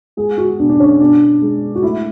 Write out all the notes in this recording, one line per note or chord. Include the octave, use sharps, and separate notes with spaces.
G#3 G#4
F#4
B2 D4
D4
C#4
B2 D4
G#3
F#4
A3 E4